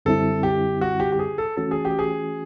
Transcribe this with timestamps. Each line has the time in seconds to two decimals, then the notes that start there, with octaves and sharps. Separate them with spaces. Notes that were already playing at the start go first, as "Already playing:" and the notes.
0.05 F#2 D3 G3 C4 E4 A4
0.43 G4
0.81 F#4
1.00 G4
1.12 G4
1.19 G#4
1.38 A4
1.57 E3 A3 C#4 F#4 A4
1.71 G#4
1.85 G4
1.99 G#4